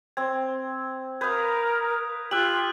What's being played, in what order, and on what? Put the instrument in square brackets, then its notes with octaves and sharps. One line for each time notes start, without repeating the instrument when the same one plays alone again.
[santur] C4 [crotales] G#6
[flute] A#4 [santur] B4 F5 [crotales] D#6 G6 G#6
[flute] F4 [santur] G4 E6 [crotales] F#6 F#7